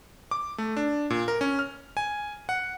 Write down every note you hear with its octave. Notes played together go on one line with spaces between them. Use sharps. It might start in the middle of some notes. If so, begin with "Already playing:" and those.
D6
A3
D4
A#2
A#4
C#4
F6
G#5
F#5